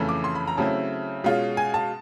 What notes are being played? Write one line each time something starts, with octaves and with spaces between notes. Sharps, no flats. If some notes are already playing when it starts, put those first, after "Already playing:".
Already playing: F2 C#3 E3 A3
D6
C6
B5
A#5
C#3 F#3 A3 C4 E4 A5
B2 G#3 C#4 F4
G#5
A5